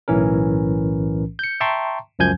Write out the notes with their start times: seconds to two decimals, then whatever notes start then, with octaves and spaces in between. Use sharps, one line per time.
0.08 B1 A2 E3 C#4 A#4
1.39 G6 C#7
1.60 E5 G5 A5 A#5 C6 C#6
2.19 C#2 F#2 F3 G#5 G6 G#6